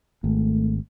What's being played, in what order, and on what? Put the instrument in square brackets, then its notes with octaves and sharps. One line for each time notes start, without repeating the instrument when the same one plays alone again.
[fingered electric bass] G#1 [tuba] A3